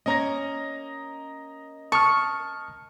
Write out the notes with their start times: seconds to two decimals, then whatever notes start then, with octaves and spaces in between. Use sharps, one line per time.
0.06 A#3 C#4 C#5 D#5 A#5 A#6
1.92 A5 C#6 D#6 F6